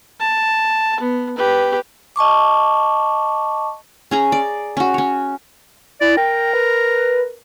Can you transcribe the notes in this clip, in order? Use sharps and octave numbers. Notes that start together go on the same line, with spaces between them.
A5
B3
G4 B4
D#5 A5 C#6 D6
C#4 G#4 A#5
D5
C#4 F#4
C#4 C#5
E4 D5
A#4 G5
B4